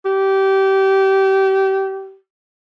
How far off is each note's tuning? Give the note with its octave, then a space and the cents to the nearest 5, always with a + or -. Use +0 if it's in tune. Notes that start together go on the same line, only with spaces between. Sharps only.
G4 -25